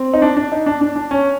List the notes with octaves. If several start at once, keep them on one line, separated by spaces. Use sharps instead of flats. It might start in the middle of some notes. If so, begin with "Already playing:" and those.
Already playing: C4
D#4
D4
D4
D#4
D4
D4
D4
C#4